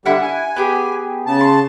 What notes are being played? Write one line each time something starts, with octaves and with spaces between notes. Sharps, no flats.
D3 G3 E4 F#5
G#5
B3 G4 G#4
C#3 A5
C6